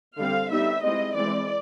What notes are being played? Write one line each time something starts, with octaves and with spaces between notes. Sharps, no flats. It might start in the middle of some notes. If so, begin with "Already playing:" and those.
D3 G3 C4 F5
G3 B3 D#4 E5
G#3 C4 E4 D#5
E3 G#3 C4 E4 D5